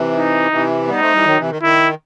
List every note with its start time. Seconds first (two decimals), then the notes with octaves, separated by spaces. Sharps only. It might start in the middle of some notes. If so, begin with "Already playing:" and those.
Already playing: C3 E3
0.14 D#4
0.52 C3 E3
0.87 G3 B3 D#4
1.00 A3 C4
1.13 E3 G3
1.25 D#3 F#3
1.38 C3 E3
1.50 D#3
1.62 D#3 E4